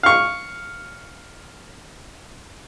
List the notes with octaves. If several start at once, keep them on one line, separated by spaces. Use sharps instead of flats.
F5 C#6